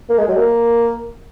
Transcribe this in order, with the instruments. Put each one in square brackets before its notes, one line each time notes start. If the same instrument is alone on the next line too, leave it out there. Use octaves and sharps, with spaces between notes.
[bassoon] A#3
G#3
F#3
A#3